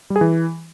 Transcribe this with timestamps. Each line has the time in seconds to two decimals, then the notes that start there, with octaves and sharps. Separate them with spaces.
0.10 G3
0.16 G#4
0.21 E3